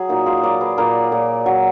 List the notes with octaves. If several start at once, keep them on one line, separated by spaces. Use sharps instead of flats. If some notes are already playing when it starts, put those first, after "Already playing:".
Already playing: F#3 G#4
A#2 D#4 F#4
F4 G#4
F#3 A#4 D5
G#4 B4
A#2 A#4 D5
A#2
F#3